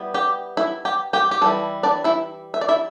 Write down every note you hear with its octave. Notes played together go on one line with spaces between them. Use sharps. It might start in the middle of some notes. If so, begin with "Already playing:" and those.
Already playing: G3 B3 E4
G4 G5
E4 E5
G4 G5
G4 G5
G4
E3 G3 E4 A4
D4 D5
E4 E5
E5
D5
E4 E5